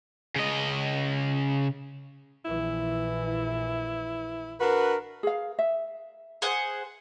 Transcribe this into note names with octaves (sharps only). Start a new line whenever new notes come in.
C#3 D#5
A#1 E3 E4
D4 F#4 A#4 B4
G#4 F5
E5
G#4 C5 F#5